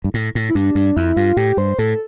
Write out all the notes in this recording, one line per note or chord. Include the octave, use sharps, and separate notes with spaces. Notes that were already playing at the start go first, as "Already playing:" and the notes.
G2
A2
A2
E4
G2 D4
G2
F2 E4
G2 F4
A2 G4
G2 C5
A2 A4